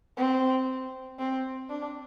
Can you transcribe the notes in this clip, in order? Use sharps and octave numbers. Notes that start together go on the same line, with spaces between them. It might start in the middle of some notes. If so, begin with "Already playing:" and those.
C4
C4
D4